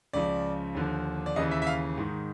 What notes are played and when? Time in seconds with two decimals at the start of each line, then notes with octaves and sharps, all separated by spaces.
0.13 C#2 C#3 F3 D5
0.75 D#2 D3 F3
1.26 D5
1.36 D#2 C#3 E3 D#5
1.51 E5
1.62 E5
1.67 F5
1.98 G#2 D#3